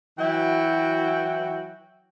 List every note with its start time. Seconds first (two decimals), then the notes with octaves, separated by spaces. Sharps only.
0.18 E3 F#3 E4 F#4 G5